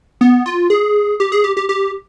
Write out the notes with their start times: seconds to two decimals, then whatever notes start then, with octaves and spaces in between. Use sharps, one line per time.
0.21 B3
0.46 F4
0.70 G#4
1.20 G4
1.32 G#4
1.44 G4
1.57 G4
1.69 G4